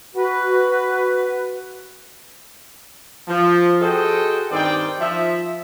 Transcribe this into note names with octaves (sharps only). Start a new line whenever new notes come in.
F#4 B4
F3
F#4 G#4 A4 C5 D#5 G5
G2 D#3 C4 D#4 D5 G5
F3 E5